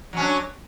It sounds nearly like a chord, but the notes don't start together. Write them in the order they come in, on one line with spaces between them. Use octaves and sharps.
F#3 C#4 D4